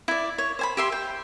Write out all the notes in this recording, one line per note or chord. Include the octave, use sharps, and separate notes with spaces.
E4 D5
C#5
C5 G#5 B5
G4 E5 C6
G5